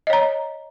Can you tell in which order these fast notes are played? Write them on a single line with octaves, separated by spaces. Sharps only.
D#5 C#5 A#5